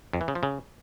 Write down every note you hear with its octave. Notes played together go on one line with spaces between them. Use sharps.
F2
E3
C#3
F3
C#3